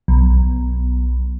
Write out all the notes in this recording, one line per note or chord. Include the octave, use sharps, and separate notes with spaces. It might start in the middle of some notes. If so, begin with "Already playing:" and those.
B1